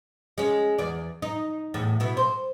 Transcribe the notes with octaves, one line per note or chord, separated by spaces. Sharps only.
G#3 C#4
E2 D5
D#4
E2 A2
B2 E4
C5